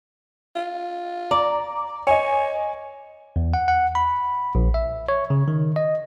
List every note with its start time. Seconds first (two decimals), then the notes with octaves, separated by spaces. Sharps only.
0.56 F4
1.31 D5 A#5
2.07 C#5 D#5 G#5
3.36 E2
3.54 F#5
3.68 F#5
3.95 B5
4.55 A#1
4.74 E5
5.09 C#5
5.30 C#3
5.48 D#3
5.76 D#5